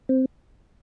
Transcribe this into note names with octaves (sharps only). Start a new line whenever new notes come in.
C4